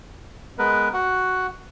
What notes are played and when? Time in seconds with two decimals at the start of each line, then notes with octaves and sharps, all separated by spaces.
0.59 G#3 B3 A#4 B4
0.94 F#4 F#5